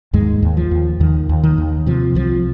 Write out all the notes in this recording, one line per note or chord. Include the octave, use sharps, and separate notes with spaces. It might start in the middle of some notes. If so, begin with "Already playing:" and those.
D#2 G#2 G#3
D#2
F3
D#2
D#2 D#3
D#2
D#3
D#2
C3 F3
C2 F3